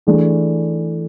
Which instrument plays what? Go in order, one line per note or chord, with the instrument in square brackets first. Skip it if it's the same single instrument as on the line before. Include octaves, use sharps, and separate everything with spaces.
[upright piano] E3 A3 D4 G#4